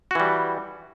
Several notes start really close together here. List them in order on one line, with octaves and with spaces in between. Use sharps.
F#4 E3 G3